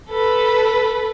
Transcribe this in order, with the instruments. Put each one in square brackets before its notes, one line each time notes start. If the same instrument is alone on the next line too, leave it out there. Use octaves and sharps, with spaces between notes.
[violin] A4 B4